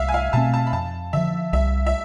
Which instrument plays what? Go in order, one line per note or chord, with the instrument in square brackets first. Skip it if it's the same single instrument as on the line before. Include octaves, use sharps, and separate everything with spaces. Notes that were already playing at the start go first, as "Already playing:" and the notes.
Already playing: [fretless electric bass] C2 [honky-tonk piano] E5 F5
[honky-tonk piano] G#5
F5
[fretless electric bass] B2 A3 C4 [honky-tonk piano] A5
[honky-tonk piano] A5
B5
[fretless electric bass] F2 [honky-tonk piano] A5
[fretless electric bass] D3 F3 [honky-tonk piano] E5
[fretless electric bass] C2 [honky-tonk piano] E5
[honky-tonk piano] E5